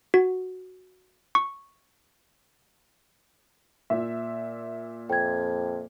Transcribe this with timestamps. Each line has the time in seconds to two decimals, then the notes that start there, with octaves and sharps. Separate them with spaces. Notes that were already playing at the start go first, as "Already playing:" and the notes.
0.14 F#4
1.35 C#6
3.90 A#2 E5
5.09 F2 G5 G#6